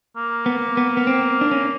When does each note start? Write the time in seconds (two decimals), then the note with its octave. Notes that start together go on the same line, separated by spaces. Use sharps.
0.16 A#3
0.46 B3
0.77 B3
0.97 B3
1.07 C4
1.41 D4
1.51 C#4